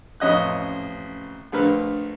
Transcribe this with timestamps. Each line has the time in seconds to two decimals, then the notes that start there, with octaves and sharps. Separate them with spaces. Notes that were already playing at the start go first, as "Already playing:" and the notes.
0.20 A1 F2 C#4 D#5 D#6 F#6
1.52 A#1 D3 A3 A#4 B4 F6